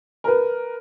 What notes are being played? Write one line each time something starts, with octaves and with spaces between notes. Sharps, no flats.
A#4 B4